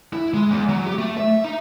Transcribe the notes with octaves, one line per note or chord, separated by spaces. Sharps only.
E4
G#3
E2
F#3
G4
A3
E5
D#4